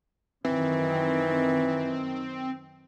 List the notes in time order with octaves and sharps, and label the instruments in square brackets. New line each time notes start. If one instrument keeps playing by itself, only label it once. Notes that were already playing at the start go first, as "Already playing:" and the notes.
[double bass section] F#2 D#3 [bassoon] E3 [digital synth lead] C4